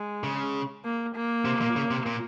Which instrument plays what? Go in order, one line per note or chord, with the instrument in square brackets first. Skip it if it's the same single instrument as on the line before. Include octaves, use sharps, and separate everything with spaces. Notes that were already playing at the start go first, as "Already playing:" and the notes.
Already playing: [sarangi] G#3
[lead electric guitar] C#3
[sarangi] A#3
A#3
[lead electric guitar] C3
A#2
C#3
C3
A#2